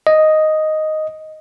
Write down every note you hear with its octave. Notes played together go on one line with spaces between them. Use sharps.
D#5